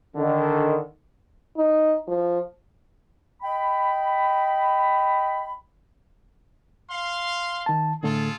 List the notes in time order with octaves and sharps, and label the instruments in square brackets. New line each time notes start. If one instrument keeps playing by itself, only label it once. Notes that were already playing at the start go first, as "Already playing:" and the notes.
[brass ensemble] D3 D#3
[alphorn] D#4
F3
[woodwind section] D#5 G5 B5
[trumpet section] F5 C6
[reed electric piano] D#3 A5
[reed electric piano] A2 D3 A3 [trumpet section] F4 G#4 A4